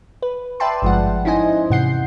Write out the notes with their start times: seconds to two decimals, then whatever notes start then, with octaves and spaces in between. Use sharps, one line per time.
0.22 B4
0.60 B4 D5 E5 G5 A5 C6
0.82 G#1 G2 F3 G#3 F#5
1.25 C#4 D#4 E4 C5 D#5 G#5
1.70 E2 G#2 C3 F#5 G6 C7